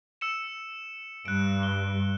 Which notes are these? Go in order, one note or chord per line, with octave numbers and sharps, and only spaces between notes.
E6 C#7 E7
G2 F#6 D7
G7